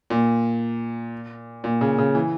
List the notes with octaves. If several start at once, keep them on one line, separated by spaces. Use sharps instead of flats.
A#2
A#2
C#3
C#3
E3